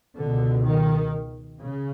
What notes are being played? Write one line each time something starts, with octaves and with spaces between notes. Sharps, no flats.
C#2 B2 D3
D#3
C#3